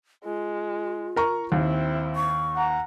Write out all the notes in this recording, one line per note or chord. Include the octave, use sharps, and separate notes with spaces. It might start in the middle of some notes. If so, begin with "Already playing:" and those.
G#3 F4
A#4 A#5 C#6
D#2 C4 E4
C#6
F#5 A#5